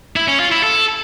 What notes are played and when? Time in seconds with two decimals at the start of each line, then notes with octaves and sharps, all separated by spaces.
0.16 E4
0.28 C#4
0.40 F4
0.52 E4
0.63 A4